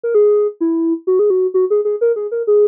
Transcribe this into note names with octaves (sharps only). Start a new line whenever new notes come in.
A#4
G#4
E4
F#4
G#4
F#4
F#4
G#4
G#4
A#4
G#4
A#4
G#4